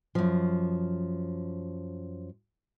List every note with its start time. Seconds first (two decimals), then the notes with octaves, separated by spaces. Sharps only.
0.15 F#2 F3